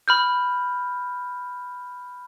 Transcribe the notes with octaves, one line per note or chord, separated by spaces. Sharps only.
B5 F6 G6